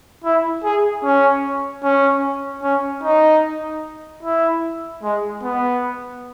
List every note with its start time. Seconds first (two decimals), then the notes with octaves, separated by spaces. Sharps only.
0.24 E4
0.64 G#4
1.04 C#4
1.84 C#4
2.63 C#4
3.03 D#4
4.23 E4
5.03 G#3
5.43 B3